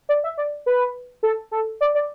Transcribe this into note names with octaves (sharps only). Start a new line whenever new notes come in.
D5
E5
D5
B4
A4
A4
D5
D5